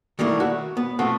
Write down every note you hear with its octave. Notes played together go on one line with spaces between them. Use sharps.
D#3 G3 A3 A#3 E4
F#4
B3
F3 A3 B3 C4 F#4